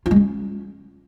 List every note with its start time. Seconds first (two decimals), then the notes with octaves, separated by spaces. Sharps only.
0.06 F4
0.11 G#3
0.16 C#4